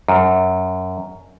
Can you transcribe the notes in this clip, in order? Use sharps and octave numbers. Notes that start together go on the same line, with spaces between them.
F#2